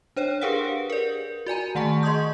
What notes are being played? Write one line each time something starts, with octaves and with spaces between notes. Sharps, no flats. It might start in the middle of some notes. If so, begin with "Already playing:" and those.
D4 C5 C#5 G5
G4 G#4 A#4 B4 F5 F#5
A#4 D5
F#4 D5 G#5 A#5
D#3 A3 F#5 A5 C#6
G#4 D#5 C6 C#6 D#6 G6